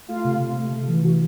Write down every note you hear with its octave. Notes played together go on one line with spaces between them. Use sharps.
A3 F4
C3
C3
A3
C3
E3
E3 F#4